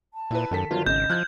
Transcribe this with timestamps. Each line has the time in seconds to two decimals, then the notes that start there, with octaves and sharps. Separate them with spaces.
0.14 A5
0.31 A#2 E4 B4
0.51 F#2 D#3 A4 B6
0.71 G1 D#3 F#3 F4
0.86 G#1 C#3 D#5 G6
1.10 F3 F6 F#6 G#6